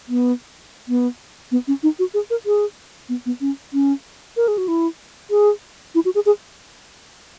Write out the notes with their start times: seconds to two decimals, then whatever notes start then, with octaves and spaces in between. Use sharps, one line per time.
0.08 B3
0.88 B3
1.52 B3
1.68 C#4
1.83 D#4
1.99 F#4
2.14 G#4
2.30 A#4
2.46 G#4
3.09 B3
3.26 B3
3.41 C#4
3.73 C#4
4.37 A#4
4.48 G#4
4.58 F#4
4.68 E4
5.30 G#4
5.95 E4
6.05 F#4
6.15 G#4
6.26 G#4